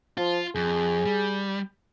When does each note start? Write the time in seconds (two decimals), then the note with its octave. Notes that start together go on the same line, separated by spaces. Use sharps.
0.17 F3 F4
0.55 F2 G#4
1.06 G3